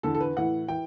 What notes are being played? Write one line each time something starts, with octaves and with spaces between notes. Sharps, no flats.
E2 D3 A4
A4
B4
A2 E3 F#5
E3 G5